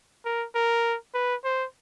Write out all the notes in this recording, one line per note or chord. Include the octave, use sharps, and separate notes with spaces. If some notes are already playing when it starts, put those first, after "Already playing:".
A#4
A#4
B4
C5